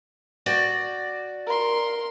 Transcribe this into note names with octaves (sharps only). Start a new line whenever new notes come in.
F#4 D5 G5
A#4 C6